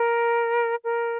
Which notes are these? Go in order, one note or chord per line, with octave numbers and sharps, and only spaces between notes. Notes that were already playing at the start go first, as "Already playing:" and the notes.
Already playing: A#4
A#4